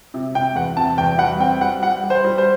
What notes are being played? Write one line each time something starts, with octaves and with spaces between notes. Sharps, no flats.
C3
C3 G5
E2 F#5
C3 A5
E2 G5
G3 F#5
C4 G5
G3 F#5
G3 F#5
G3
C5
G3
C5